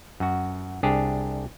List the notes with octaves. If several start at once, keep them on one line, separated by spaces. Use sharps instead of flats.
F#2 F#4
C2 D4 G4 G#4